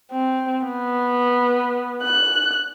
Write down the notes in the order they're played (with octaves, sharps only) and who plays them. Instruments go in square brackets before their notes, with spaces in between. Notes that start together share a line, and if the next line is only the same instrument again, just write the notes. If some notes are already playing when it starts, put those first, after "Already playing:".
[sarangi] C4
B3
[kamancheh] F#6